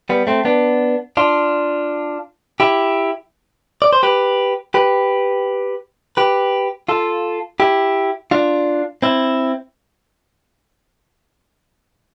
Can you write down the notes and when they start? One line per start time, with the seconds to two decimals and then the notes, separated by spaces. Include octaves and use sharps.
0.09 G3 B3
0.27 A3 C4
0.45 B3 D4
1.17 D4 F4
2.60 E4 G4
3.82 D5
3.93 C5
4.03 G4 B4
4.74 G4 B4
6.17 G4 B4
6.89 F4 A4
7.60 E4 G4
8.31 D4 F4
9.02 C4 E4